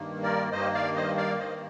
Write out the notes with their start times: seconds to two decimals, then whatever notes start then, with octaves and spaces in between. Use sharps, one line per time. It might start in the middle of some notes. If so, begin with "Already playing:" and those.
Already playing: G2 D#3 A#3
0.23 A#4 D5
0.52 G2 D#3 A#3 C5 D#5
0.74 D5 F5
0.96 C5 D#5
1.17 D5 F5
1.39 G2 D#3 A#3 C5 D#5